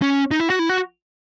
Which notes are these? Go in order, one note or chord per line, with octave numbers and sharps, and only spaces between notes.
C#4
D#4
E4
F#4
E4
F#4